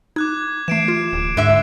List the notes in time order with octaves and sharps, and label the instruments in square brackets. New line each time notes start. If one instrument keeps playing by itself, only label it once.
[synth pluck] D#4 [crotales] D6 F#6 G#6
[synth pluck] E3 A3 [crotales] C7 D7 E7
[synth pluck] F4
[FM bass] D1
[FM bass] G#2 [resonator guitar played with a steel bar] D3 E5